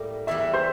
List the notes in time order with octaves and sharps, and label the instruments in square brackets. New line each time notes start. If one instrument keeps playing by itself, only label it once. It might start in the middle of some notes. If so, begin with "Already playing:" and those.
Already playing: [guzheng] A2 G3 A#3
[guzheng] E2 E3 G3 [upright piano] E5
[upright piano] C5